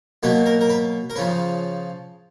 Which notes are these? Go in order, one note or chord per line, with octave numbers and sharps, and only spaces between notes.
B2 F#3 A#3 B4
A#4
A#4
B4
A#4
C#3 F3 B4